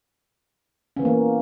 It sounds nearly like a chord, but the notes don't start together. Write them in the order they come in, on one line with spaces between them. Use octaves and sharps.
C#4 E3 B3 A#3